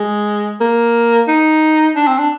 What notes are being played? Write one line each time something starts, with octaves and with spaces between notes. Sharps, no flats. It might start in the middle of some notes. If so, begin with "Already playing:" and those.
Already playing: G#3
A#3
D#4
D4
C4
D4